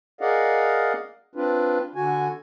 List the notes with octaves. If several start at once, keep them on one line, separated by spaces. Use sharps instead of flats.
G#4 A#4 D5 D#5 F5 F#5
C4 D4 F4 B4
D3 F#4 G#5